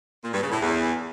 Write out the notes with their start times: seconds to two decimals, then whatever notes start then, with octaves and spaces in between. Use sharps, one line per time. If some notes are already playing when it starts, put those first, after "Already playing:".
0.24 A#2
0.33 G2
0.42 C#3
0.52 A2
0.61 E2